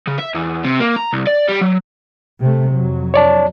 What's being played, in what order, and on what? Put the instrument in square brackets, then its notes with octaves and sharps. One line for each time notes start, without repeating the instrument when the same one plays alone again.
[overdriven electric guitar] C#3
E5
E2
C3
A#3
A#5
C2
D5
G3
F#3
[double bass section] C3 A3
F2 F#3
[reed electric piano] C#5 D5 A5